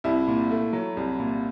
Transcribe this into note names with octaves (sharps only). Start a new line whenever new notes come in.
C2 E4
A#2
A3
F#3
C2
A#2